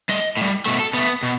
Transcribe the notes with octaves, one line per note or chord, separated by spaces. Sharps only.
A2 G3 D#5
A2 G3
B2 A3
A4
B2 A3 B3
B2